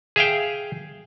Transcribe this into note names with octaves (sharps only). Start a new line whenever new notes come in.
G#4 E5 F5 G5